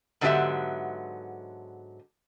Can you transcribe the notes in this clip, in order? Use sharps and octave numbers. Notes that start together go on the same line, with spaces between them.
G#2 D3 F#3 B3 G4 E5